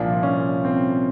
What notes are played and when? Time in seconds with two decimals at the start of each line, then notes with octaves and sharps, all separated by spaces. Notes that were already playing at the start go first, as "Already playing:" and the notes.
Already playing: C2 A#2 F3 D4
0.23 C#4
0.65 C4